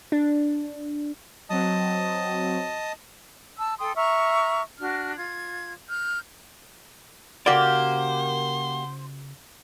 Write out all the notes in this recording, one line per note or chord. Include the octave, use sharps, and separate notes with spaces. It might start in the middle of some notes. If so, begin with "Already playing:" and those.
D4
F#3 C4 D#5 A5 D#6
A5 E6
A4 G5 C6 D#6
E5 A#5 C#6 F6
D4 F#4 F6
F4 G#6
F6 G6
C#3 A#3 F#4 G4 C5 D5 F#5